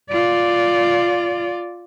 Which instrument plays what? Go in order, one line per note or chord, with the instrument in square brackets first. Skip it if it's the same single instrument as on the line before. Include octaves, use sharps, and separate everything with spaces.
[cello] F4 D5